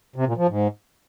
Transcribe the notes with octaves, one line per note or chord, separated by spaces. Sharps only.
C3
A#2
F3
G#2